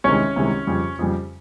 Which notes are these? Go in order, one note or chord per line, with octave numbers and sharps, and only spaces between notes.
C2 C3 D#3 G#3 C#4 C#5
C2 C3 D#3 G#3
F2 C#3 G3
F2 C#3 G3